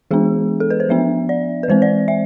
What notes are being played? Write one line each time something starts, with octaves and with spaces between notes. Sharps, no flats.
E3 G#3 B3 D4 G#4
A4
B4
C5
F3 B3 D4 E5
D5
B4
E3 G#3 C4 C5
D5
E5